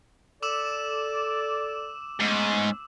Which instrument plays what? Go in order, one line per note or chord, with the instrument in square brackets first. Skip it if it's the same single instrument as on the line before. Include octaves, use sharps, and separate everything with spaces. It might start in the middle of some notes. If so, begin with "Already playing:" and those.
[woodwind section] A4 D5 [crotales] D6 E6 E7
[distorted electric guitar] G#2 [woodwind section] A3 B3 C#4